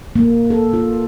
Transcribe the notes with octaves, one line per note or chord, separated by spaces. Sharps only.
A#3
A4
F4